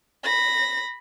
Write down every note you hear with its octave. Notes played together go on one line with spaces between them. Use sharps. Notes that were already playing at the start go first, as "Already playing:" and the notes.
B5 A#6